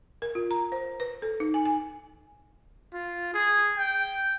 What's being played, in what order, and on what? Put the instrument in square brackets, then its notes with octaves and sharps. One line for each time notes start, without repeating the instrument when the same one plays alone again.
[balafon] A#4
F4
A#5
C5
B4
A4
D#4
G#5
G#5
[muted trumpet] F4
G#4
G5